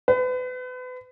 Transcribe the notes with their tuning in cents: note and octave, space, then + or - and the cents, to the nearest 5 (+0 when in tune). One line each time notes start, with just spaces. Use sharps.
B4 +35